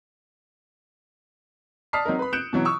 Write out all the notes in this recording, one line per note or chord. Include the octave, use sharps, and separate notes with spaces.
D5 A5 D#6 F6 B6 C7
F#3 C4 D#4 A#4
B4 B5
F#6 G6 C#7 D7 E7
B2 E3 F#3
C#6 D#6 E6